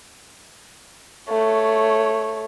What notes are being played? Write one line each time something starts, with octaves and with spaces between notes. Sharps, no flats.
A3 C#5